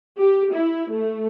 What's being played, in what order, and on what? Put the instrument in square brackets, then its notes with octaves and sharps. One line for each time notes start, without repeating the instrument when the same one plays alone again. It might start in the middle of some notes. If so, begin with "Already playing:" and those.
[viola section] G4
E4
A3